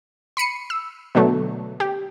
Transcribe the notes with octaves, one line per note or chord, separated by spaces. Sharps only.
B5 C7 C#7 D#7
E6
B2 D3 F#3 A3
G4